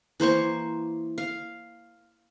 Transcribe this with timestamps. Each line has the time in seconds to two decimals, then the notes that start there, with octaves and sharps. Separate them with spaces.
0.20 E3 A#3 C5 C#6
1.18 F5